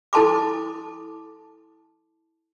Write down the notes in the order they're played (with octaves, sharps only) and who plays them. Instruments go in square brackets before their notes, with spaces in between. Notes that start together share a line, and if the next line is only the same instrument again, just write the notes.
[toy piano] E4 A4 A5 C6 D6